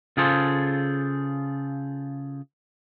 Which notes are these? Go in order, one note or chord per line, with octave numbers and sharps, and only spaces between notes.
C#3 F4 G#4 A4 C5